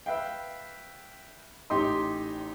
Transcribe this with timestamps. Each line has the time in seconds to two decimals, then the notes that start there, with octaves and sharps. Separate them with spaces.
0.06 B4 E5 F5 G5
1.70 A1 D#4 G4 D#5 C6